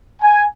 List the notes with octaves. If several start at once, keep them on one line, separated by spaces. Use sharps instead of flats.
G#5